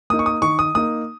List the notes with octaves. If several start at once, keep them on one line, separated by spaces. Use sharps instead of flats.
A#3 D#4 D#6
C#6
D#6
D#3 C#6
D#6
A#3 D#4 D#6